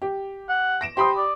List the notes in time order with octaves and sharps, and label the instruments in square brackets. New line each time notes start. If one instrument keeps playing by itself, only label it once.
[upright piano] G4
[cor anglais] F#5
[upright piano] A#6 D7 E7
[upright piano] G4 B5 D#6 [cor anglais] C5
[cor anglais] D5